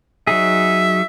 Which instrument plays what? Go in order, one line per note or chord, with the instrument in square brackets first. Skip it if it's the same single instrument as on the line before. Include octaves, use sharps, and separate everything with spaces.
[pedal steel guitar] F#3 D#4 G#4 [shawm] E5